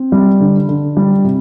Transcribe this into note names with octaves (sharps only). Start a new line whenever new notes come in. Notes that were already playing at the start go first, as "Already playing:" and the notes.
Already playing: C4
G3
D3
D3
G3
C3